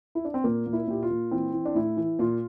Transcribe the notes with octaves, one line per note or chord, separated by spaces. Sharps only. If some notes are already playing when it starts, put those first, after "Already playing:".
E4
D4
C4
A#2 A#3
A#2
E4
A#2 G4
F4
A#2
E3 C4
E3
D4
A2 E4
E3
A#2 F4